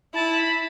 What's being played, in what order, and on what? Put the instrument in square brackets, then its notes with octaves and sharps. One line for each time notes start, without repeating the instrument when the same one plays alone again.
[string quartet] E4 [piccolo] A5
[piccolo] B5